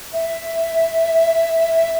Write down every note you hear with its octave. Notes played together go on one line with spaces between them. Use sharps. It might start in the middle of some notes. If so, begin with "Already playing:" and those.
E5